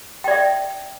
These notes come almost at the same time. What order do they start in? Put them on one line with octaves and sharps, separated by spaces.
G5 D5 E5